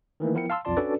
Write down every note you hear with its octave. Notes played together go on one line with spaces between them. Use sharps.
D#3 E3 A3 A#3
F3 B3 E4 A#4 G5 C#7
F5 A5 C6 E6
B1 F2 F4 D5 A5 C6
C#4 D4 F#4 A4 B4 D5